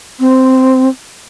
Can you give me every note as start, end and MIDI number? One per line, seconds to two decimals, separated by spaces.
0.20 0.89 60